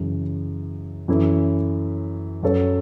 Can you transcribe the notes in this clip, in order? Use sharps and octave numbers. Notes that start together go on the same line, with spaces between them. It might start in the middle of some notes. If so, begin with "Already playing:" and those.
Already playing: F#2 C#3 E3
F#2 E3 C#4 E4 A4
F#2 F#3 C#4 A4 C#5